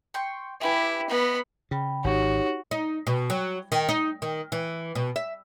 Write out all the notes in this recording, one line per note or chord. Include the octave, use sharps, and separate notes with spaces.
G5 C6 C#6
E4 G4 B4 G#5
B3 D#5 G5 A#5 B5
C#3 G5 B5
G#1 D#4 F#4 G4 C#5
D#4
B2
F#3
D#3
D#4
D#3
E3
B2
E5